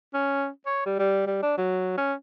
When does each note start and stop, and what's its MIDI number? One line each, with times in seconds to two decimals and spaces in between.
0.14 0.48 61
0.66 0.85 73
0.86 0.94 55
0.99 1.22 55
1.27 1.38 55
1.43 1.53 62
1.57 1.96 54
1.97 2.14 61